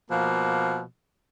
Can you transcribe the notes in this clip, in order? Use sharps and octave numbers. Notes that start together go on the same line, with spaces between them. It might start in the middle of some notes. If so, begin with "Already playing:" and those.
B2 F3 A#3